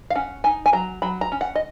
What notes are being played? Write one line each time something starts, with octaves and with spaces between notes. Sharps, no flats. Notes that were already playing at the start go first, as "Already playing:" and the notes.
F5
C#4 F#5
D#4 G#5
G#5
F#3 A#5
F#3 B5
A#5
C#4
F#5
D#5